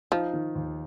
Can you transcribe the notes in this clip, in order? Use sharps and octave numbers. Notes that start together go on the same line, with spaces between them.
F3 D#4
D#3
D#2